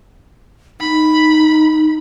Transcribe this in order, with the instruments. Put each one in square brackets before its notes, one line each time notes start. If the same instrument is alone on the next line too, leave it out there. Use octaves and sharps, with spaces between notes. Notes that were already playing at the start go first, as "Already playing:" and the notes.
[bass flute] D#4 [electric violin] B5